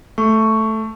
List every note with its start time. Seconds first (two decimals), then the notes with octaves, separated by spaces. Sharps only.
0.18 A3 C#6